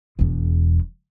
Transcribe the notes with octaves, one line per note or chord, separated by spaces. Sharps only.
E1 E2